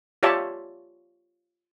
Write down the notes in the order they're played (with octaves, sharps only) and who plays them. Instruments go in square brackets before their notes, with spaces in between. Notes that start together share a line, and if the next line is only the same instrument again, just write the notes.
[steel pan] F4 G4 C#5 D5 E5 A5